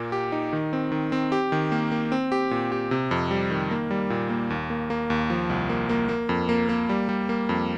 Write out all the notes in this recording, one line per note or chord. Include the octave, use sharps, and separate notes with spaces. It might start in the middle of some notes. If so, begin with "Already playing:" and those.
Already playing: A#2 A#3
G4
D#4
D#3
C4
D#3
C4
G4
D#3
A#3
A#3
C4
G4
A#2
G4
C3
F2
G3
D#3
A#3
G3
A#2
A#3
D#2
A#3
A#3
D#2
F3
C2
A#3
A#3
A#3
F2
A#3
A#3
G3
G3
A#3
F2